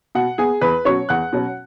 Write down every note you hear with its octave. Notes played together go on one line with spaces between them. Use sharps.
B2 F#5
B3 G#4 G#5
E2 B4 B5
B2 F#3 C#4 C#5 C#6
E2 F#5 F#6
B2 F#3 C#4